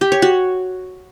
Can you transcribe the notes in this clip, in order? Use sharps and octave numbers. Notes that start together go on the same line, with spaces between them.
G4
C#5
F#4